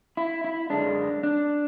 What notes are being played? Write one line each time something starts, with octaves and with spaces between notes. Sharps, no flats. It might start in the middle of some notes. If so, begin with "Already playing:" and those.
E4
E4
F#2 D3 G#3 D4
D4